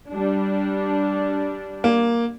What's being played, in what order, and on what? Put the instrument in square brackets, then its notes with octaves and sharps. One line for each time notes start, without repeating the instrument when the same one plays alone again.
[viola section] G3 D4
[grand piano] A#3